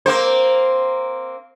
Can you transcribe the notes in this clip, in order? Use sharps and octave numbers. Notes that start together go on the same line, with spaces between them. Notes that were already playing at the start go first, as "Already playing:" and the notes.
A#3 C4 C5